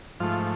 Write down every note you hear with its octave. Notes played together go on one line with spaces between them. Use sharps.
G#2 F3 A3 F4